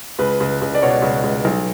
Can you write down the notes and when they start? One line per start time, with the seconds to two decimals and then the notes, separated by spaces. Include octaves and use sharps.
0.19 C#2 B4
0.40 C#2
0.62 C#2
0.75 D5
0.82 B2 C#5
1.02 C#2
1.23 C#2
1.45 B1